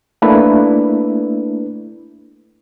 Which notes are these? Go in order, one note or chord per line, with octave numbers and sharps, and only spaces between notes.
A3 A#3 D4 E4 B4